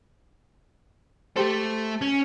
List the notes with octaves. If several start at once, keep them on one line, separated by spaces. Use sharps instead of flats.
A3 G4 A4 C5
C#4 C#5